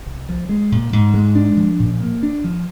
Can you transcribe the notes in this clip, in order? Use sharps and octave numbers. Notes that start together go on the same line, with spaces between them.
C2
F3
G#3
A#2
G#2
G#3
D4
F3
A#2
A#3
D4
F3